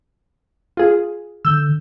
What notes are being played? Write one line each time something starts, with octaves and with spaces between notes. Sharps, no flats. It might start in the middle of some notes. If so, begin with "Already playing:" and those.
F4 G#4
D3 E6 G6